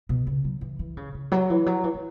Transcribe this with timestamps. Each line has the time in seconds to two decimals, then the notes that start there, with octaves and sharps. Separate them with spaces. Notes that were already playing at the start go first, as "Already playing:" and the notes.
0.09 B2
0.27 C#3
0.44 F#3
0.61 E3
0.79 E3
0.97 C#3
1.14 C#3
1.32 F#3
1.50 E3
1.66 F#3
1.84 E3
1.94 E3